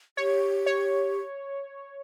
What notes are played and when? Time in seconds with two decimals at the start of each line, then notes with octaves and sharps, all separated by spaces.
0.17 G4 C#5
0.66 C#5